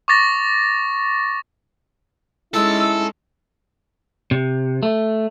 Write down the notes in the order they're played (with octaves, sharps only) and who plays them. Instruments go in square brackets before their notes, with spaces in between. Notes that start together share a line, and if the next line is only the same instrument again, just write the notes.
[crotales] C#6 D6 A6 A#6
[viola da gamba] G#3 C#4 D#4 [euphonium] E4 [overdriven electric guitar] A4 [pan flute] E6
[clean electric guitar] C3
A3